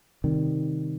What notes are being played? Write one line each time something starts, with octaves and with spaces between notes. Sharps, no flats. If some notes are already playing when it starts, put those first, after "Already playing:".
C3 D#3 G3